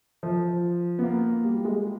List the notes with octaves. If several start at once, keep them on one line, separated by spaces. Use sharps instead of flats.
F3
B3
A#3
G3
G3
G#3